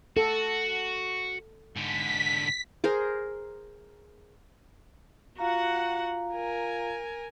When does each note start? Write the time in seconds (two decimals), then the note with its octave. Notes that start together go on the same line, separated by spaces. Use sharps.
0.17 F#4 A4
1.76 G#2 D3 B6
2.84 G#4 A#4 C5
5.39 F4 F#4 F5 F#5 A#5
6.33 A#4 G#5